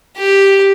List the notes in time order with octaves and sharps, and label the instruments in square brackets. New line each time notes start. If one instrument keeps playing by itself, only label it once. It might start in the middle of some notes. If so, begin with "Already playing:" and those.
[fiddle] G4